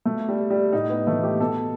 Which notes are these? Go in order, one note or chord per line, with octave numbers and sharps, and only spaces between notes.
B2 A3
G3
G3
A2 D#4
B3
E3 A3
G4
B2 A4